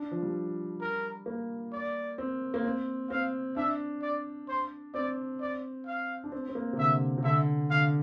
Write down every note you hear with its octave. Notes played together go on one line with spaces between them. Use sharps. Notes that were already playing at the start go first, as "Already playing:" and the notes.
Already playing: D4
F3
G3
A#4
A#3
D5
C4
A#3
C4
C4 F5
D4 E5
D5
C5
C4 D5
D5
F5
D4
C4
C4
A#3
C3
D3 E5
C3
D3 E5
D3 F5